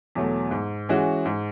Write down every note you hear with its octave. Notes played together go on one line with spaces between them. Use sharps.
E2 B2 F#3 A3
G#2
E3 G#3 C#4 F#4
G#2